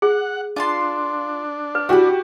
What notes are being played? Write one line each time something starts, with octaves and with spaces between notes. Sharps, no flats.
G#4 F#5
D4 F4 A5 C6
B4
F#4 G4 B5 E6